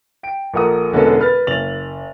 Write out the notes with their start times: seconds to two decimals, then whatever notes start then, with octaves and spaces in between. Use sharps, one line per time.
0.23 G5 D7
0.54 A#1 A4 A#4 F#5 D#6
0.93 E1 D3 G#3 B3 C#4 A4
1.20 B4 F6 A6
1.47 F#1 A6 F7 F#7